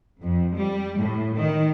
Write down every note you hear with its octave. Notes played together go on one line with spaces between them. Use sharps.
F2
G3
A2
D#3